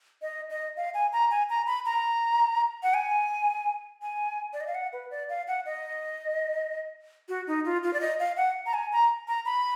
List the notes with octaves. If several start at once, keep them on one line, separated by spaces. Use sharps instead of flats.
D#5
D#5
F5
G#5
A#5
G#5
A#5
B5
A#5
F#5
G#5
G#5
D5
D#5
F5
F#5
B4
D5
F5
F#5
D#5
F#4
D#4
F4
F4
D5
D#5
F5
F#5
A#5
G#5
A#5
A#5
B5